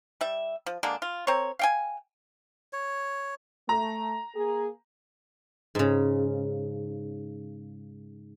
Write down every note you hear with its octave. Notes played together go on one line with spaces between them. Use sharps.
G3 E5
F3
D3 G#3 A#3 D4
F4
C4 A#4 C#5
F5 G5 G#5
C#5
A3 A#5
A#3 G#4
G#2 C#3